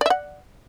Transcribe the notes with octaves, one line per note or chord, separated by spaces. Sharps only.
D5 E5 F#5